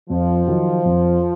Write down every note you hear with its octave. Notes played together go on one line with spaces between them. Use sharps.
F2 F3
D#3 F#3
F2